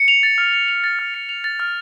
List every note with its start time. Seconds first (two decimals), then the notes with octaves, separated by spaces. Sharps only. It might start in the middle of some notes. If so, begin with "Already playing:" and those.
Already playing: C#7
0.08 F7
0.23 A6
0.38 F6
0.53 C#7
0.68 F7
0.84 A6
0.99 F6
1.14 C#7
1.29 F7
1.44 A6
1.60 F6